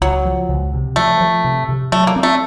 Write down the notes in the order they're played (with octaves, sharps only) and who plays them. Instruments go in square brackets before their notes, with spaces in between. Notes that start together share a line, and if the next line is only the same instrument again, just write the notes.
[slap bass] C#2 [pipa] F#3
[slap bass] F3
C#2
C3
[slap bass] F3 [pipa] A3
[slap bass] F3
C3
C3
[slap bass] F#3 [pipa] A3
[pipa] A#3
[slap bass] C4
[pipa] A3